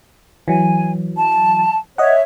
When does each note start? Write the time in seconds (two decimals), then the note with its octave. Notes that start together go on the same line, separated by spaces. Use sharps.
0.48 E3 F#3 G#5
1.16 A5
1.98 C#5 D#5 E5 F#5